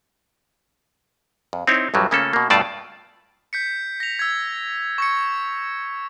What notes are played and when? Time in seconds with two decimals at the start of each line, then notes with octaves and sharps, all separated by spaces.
1.53 F2
1.67 C4 D#4 E4 C#5
1.94 A#1 G2 F#3 G3
2.11 C#3 A3 A#3 C#4 F4 A4
2.33 B2 A#3
2.50 G2 B2 A3 F4 D5 A5
3.53 G6 B6 C#7
4.00 A#6 F7
4.19 E6 G#6
4.98 C#6 G#6 C#7